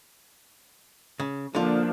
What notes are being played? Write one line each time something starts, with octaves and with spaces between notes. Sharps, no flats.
C#3
D3 F3 A#3 D4 F4